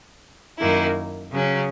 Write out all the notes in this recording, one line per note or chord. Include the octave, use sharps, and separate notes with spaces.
F#2 D#3 A#3 E4
C#3 F#3 C#4